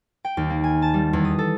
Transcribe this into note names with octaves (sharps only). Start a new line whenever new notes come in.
G5
D#2
A#3
G#5
A5
G3
E2
D#6
A4